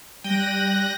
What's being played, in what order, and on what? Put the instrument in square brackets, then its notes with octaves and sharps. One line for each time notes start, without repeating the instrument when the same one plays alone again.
[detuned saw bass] G3 [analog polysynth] G5 D#7 [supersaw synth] F#6 A#6